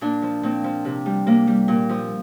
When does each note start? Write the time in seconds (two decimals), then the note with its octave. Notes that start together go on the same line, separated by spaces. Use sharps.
0.01 A#2 D4
0.22 F3
0.43 A#2 C4
0.64 F3
0.85 C3
1.06 G3
1.26 C3 A#3
1.47 G3
1.68 A#2
1.89 F3